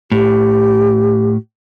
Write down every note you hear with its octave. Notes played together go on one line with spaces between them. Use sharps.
A2 G4